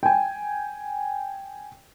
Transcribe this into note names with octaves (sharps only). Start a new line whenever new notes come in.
G5 G#5